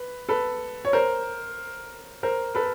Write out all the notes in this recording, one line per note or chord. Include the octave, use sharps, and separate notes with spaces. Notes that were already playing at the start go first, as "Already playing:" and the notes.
Already playing: B4
A4 B4
C#5
A#4 C5
A#4 C5
A4 B4